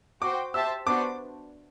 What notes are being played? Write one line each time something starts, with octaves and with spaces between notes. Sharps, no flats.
F#4 C5 G5 D6
G4 C5 E5 A5 E6
B3 D4 F#4 C5 D6